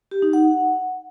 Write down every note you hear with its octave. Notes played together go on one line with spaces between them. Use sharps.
G4
D#4
F#5